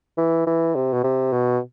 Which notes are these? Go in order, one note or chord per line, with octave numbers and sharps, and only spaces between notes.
E3
E3
C3
B2
C3
B2